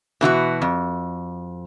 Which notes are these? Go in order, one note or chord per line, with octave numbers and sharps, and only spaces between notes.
B2 E3 F4 F#4
F2